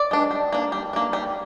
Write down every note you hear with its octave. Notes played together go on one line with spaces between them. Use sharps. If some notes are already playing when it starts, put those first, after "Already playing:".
Already playing: D5
G#3 D4
G3
A#3 D4
G3
A#3 D4
G3